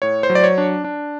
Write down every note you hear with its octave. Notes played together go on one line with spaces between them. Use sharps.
A2 C#5
C5
F#3
D5
C#5
D4
D4